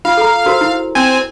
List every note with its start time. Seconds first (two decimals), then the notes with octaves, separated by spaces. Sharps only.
0.05 F4 F5
0.17 A4 A#5
0.46 F#4 A#4 C5
0.61 E4
0.95 C4 G#5